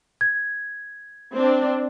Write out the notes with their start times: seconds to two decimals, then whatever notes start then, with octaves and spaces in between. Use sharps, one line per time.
0.21 G#6
1.33 C4 D4